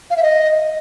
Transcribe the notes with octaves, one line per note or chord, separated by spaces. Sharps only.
F5
E5
D#5